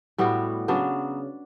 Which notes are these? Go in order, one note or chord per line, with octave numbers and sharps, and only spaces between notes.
A2 G3 B3 F#4
C#3 F#3 B3 D4